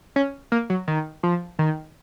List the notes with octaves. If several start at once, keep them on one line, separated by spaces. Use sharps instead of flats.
C#4
A#3
F#3
D#3
F3
D#3